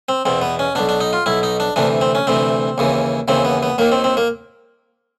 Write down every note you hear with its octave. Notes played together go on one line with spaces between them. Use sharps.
C4
E2 B2 C4
B3
C#4
B1 B2 D4
D4
D#4
F4
B1 B2 E4
D#4
D4
D2 C3 E3 D4
C4
C#4
D2 C3 E3 C4
D#2 C#3 E3
D#2 C#3 E3 C4
B3
B3
D#2 D#3 A#3
C4
C4
A#3